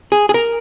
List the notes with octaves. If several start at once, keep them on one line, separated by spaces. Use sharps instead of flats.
G#4
G#4
A#4